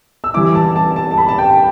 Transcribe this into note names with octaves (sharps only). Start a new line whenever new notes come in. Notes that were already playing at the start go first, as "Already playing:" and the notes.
E6
E3 G3 E4 D6
A5
A5
A5
A5
B5
A5
G5